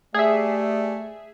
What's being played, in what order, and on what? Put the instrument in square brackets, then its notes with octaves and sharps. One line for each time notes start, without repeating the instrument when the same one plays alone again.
[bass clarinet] A3 [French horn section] G4 D5 [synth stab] G#4 E5